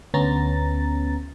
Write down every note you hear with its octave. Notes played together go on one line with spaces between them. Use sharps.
D2 B3 C#4 A#5 A6